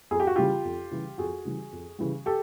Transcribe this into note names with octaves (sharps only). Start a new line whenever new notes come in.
F2 G#4
G4
F#4
C#3 E3 G3 F4 G4
F2
C#3 E3 G3
F2 F#4 G#4
C#3 E3 G3
F2
C#3 E3 G3
G4 A4